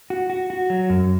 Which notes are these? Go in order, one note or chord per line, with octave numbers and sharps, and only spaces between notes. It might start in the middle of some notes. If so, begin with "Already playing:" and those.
F#4
F#4
F#4
F#3
F#2